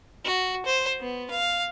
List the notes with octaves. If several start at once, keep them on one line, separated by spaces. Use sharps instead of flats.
F#4
C5
B3
F5